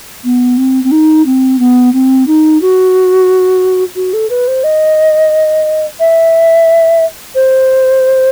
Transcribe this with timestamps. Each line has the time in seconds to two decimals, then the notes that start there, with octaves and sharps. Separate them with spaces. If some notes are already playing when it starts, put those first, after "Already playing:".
0.24 B3
0.57 C4
0.83 C4
0.91 D#4
1.25 C4
1.59 B3
1.93 C4
2.27 D#4
2.61 F#4
3.95 F#4
4.13 A4
4.29 B4
4.47 C5
4.63 D#5
6.00 E5
7.35 C5